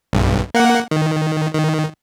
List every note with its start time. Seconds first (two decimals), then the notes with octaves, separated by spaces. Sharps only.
0.13 B1 G2
0.54 A#3 F#5
0.91 D#3
1.54 D#3